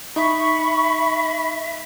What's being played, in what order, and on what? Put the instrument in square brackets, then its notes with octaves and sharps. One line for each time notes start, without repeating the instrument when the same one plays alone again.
[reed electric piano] D#4 [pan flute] E5 [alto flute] B5 [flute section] C#6